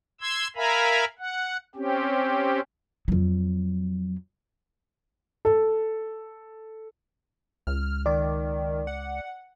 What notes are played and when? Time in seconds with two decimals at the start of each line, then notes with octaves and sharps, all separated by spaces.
0.21 C6 E6 G#6
0.56 A#4 E5 F5 G#5 A#5 B5
1.19 F#5
1.75 C4 C#4 G4
3.08 F2 F#3
5.45 A4
7.67 C#2 F6
8.06 D#3 D5
8.87 F#5